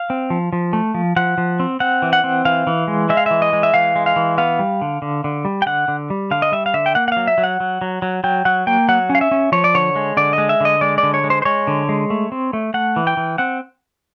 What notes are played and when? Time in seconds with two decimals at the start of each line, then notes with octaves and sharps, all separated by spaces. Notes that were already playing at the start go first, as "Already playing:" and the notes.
Already playing: F5
0.10 C4
0.30 F3
0.53 F3
0.73 A3
0.94 F3
1.16 F3 F#5
1.38 F3
1.60 C4
1.80 C4 F#5
2.02 E3
2.13 F#5
2.24 C4
2.45 E3 F5
2.67 E3
2.88 G#3
3.09 G#3 E5
3.17 F5
3.26 E3 E5
3.42 D#5
3.53 G#3
3.63 E5
3.74 E3 F5
3.96 G#3
4.06 F5
4.16 E3
4.38 B3 F5
4.59 G3
4.81 D3
5.02 D3
5.24 D3
5.45 G3
5.62 G5
5.66 D3 F#5
5.88 D3
6.10 G3
6.31 D3 F5
6.42 D#5
6.52 G3 E5
6.66 F5
6.74 D3 E5
6.86 G5
6.95 A#3 F#5
7.08 F#5
7.12 F#3 F5
7.27 E5
7.38 F#3
7.44 F#5
7.60 F#3
7.81 F#3
8.02 F#3
8.24 F#3 G5
8.45 F#3 F#5
8.67 A#3 G5
8.89 F#3 F#5
9.10 C#4
9.15 F5
9.21 E5
9.31 C#4
9.52 F3 C#5
9.64 D5
9.74 D3 C#5
9.96 G#3
10.17 D3 D5
10.33 D#5
10.38 G#3
10.49 E5
10.61 D3 D#5
10.81 G#3 D5
10.98 D5
11.03 D3
11.14 C#5
11.24 G#3
11.30 C5
11.42 C5
11.45 G#3 C#5
11.67 D3
11.89 G#3
12.10 A3
12.32 C4
12.53 A3
12.74 A3 F#5
12.96 E3
13.07 G5
13.17 E3
13.38 C4 F#5